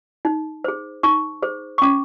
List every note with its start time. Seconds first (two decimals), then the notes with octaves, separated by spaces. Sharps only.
0.25 D#4
0.64 G#4 C5
1.03 D#4 C#6
1.42 G#4 C5
1.78 C#6
1.82 C#4 D6